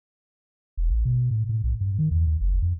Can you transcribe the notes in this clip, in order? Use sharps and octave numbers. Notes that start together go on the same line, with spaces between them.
E1
A1
B2
A2
A2
B1
G2
D#3
E2
D#2
F#1
F2